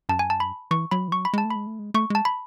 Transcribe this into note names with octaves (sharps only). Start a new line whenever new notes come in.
F#2 A5
G#5
A5
B5
E3 C#6
F#3 B5
E3
F#3 C#6
B5
G#3 A5
A3
G#3 B5
A3
G#3
A3 C#6
G#3 A5
B5